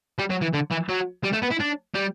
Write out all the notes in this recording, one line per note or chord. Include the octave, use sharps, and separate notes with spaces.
G3
F#3
E3
D3
E3
F#3
G3
A3
B3
E4
D4
G3